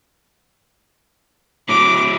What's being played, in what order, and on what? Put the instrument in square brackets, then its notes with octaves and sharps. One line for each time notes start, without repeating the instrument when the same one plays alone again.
[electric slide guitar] A2 F#3 A3 [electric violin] D6